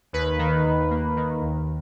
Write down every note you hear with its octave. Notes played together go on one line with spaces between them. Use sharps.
D#2 B4
D#3
D#2
A#3
D#3
D#2